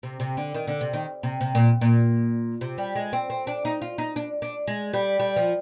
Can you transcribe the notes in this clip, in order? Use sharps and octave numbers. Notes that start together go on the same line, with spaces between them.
C3
C3
D3
D#3
D3
C3
D#3
C3
C3
A#2
A#2
C3
G3
G#3
C4
C4
D4
D#4
F4
D#4
D4
D4
G#3
G3
G3
F3